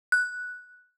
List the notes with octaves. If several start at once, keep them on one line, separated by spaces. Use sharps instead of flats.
F#6